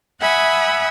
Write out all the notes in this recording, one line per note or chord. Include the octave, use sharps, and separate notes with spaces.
E5 F#5 G#5 B5 D#6